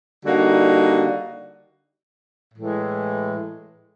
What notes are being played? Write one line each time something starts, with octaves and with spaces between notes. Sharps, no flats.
D3 G3 A#3 D#4 F#4
A2 E3 G#3